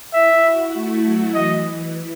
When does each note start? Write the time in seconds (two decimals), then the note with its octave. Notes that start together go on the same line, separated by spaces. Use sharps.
0.14 E4 E5
0.44 F#4
0.74 A3
1.04 F#3
1.34 E3 D#5